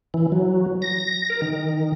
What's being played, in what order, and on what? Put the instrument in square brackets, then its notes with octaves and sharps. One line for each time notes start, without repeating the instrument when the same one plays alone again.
[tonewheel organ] E3
F#3
A#6
A#4
D#3